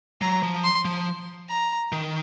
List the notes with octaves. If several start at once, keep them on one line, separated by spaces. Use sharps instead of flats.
F#3 A#5
F3
C6
F3
A#5
D#3